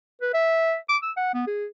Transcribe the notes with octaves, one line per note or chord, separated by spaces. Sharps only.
B4
E5
D6
E6
F#5
B3
G#4